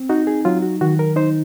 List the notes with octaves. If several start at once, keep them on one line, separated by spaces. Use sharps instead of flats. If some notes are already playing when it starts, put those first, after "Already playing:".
Already playing: C4
D#4 F#4
G#4
F#3 F4
F#4
D#3 F#4
A#4
D#4 C5